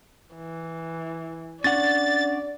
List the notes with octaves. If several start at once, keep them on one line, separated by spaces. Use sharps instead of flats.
E3
C#4 D4 D5 F#5 A6